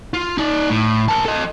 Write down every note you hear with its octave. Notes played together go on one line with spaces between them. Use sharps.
F4
D#4 D5
A2
A#4 A5
A4 D#5